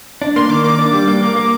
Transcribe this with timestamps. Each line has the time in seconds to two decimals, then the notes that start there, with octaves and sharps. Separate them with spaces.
0.22 D4
0.36 A#3 C6
0.50 D#3 D6
0.64 A#3 D6
0.79 D4
0.93 G3
1.07 A#3
1.22 A#3
1.36 A#3